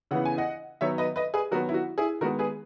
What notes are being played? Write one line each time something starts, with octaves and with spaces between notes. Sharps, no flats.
C#3 E3 B3 F#5
G#5
D#5 F#5
D#3 F#3 B3 C#5 E5
B4 D#5
B4 D#5
G#4 B4
D#3 F#3 B3 F#4 A#4
E4
F#4
E4 G#4
D#3 G#3 B3 F#4 A#4
G#4 B4